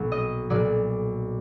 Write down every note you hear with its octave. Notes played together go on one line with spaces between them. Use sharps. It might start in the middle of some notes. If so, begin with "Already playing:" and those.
Already playing: B1 A#2 F#3
D#5
B1 A#2 F#3 D5